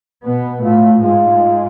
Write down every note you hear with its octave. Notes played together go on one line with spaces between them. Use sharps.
B2 B3
A2 A3 F4
G#2 G#3 F4